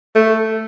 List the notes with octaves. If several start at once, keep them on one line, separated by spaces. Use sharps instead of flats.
A3